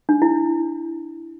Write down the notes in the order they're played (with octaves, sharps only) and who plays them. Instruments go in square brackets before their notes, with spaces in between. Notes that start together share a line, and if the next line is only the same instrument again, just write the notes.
[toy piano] D4
E4